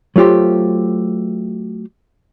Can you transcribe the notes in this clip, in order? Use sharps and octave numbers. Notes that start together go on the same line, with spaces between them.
F#3 A3 F4 G4 C5